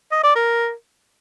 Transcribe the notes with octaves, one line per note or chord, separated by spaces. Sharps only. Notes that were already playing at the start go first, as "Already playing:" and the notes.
D#5
D5
A#4